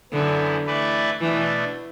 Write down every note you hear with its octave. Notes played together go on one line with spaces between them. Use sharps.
F#2 D3 E3 B3
E3 A3 E4 B4 D5
B2 E3 A3 D4